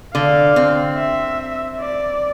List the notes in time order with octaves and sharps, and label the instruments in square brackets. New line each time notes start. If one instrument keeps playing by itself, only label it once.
[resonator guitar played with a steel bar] D3 [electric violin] F5
[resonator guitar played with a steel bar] C4
[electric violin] E5
D5